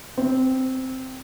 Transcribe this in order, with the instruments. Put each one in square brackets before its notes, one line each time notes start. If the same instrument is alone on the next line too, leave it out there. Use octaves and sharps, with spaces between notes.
[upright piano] C4